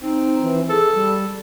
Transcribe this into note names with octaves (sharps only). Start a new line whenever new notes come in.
C4 D#4
E3
G#4 A4
G3